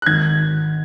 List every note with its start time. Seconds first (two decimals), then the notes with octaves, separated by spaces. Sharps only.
0.02 F#6
0.06 G#1 G#6